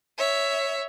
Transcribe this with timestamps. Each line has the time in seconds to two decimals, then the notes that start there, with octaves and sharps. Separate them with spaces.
0.18 C#5 E5